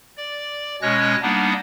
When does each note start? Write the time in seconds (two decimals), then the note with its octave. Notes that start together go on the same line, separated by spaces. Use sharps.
0.17 D5
0.82 B2 G#3 C#4 C#5 F#6 A#6
1.22 G3 A#3 B3 D4 D#4